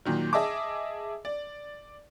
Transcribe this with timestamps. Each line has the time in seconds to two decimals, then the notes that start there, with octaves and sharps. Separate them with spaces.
0.06 A#2 D#3 F#3
0.33 G#4 D#5 E5 A5 D6
1.25 D5